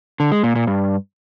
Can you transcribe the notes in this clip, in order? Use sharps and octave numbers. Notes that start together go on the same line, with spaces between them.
D3
G#3
A#2
A#2
G2